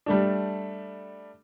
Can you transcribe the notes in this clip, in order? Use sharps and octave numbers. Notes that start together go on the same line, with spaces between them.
G3 A3 D4